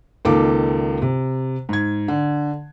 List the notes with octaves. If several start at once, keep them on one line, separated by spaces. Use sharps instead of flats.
C#2 D#3 A#3 A4 D6
C3
G#2 G#6
D3